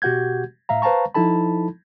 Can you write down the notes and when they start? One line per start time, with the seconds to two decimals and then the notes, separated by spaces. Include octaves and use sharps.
0.02 B2 F#4 G4 F#5 G6 G#6
0.69 A2 E5 F5 A#5
0.82 B4 C5 F5 A5 A#5 C#6
1.14 F3 D#4 E4 A4 A5 B5